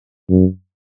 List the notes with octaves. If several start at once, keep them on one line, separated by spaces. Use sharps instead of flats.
F#2